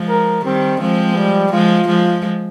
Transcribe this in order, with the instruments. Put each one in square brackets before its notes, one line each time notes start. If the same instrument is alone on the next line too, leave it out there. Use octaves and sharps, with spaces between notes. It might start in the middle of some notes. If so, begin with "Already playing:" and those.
Already playing: [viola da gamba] F3 G#3
[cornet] A#4
[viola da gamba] D#3 G3 [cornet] C4
[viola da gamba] F3 G#3 [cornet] C4
[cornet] G3
[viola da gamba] F3 G#3 [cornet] F4
[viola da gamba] F3 G#3